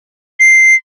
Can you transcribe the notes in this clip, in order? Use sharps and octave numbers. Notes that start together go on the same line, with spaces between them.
C7